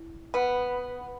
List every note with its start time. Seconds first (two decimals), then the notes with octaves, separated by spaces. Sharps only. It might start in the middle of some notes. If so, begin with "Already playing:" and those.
Already playing: E4
0.34 B3 B4 F#5 B5